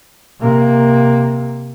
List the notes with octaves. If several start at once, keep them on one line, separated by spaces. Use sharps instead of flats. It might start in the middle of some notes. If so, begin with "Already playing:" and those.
C3 A#3